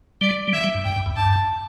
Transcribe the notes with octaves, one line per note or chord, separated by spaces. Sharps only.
G3 D5
G3
E3 E5
G3
G2
G2 G5
G2
E2
G2 A5